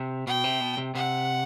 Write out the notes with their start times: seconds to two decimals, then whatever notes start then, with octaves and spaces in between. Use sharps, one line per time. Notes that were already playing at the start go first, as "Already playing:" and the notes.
Already playing: C3
0.27 B2 G5
0.44 C3
0.60 B2
0.78 C3
0.94 C3 F#5